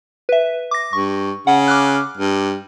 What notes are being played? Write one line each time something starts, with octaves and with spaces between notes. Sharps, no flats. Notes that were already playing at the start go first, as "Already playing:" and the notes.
B4 E5
D6 A#6
G2 C#6
C#3 F#5
D6 F6 F#6
G2